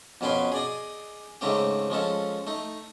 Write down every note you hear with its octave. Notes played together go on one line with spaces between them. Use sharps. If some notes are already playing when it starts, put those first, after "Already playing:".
F2 B2 C#4 B4 G5 C6
G#4 D5 D#5
G#2 C#3 A3 C4 G4
F3 G#3 C#4 A4
A3 D#4